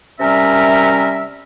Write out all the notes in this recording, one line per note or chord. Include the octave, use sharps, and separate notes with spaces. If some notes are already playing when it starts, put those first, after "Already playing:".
C3 G3 C#4 A#4 E5